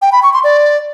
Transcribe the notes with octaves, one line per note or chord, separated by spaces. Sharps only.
G5
B5
C#6
C6
D5